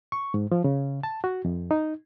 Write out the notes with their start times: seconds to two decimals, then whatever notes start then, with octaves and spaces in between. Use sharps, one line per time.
0.12 C#6
0.34 G#2
0.52 F3
0.64 C#3
1.03 A5
1.24 F#4
1.45 F2
1.71 D#4